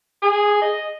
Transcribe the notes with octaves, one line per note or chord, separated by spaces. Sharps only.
G#4
D#5